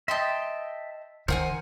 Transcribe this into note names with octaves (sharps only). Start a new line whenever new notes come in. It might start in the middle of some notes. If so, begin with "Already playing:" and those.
D#5 E5 G5 A5 C6
D#3 A#4 C5 F#5 G#5